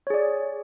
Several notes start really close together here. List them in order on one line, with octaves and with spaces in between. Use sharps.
C#5 G#4 D5